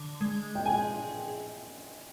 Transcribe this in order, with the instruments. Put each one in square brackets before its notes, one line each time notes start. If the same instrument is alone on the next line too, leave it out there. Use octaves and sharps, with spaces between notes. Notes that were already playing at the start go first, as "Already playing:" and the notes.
Already playing: [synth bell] D3
G#3
[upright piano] G5
[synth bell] G#4 [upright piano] G#5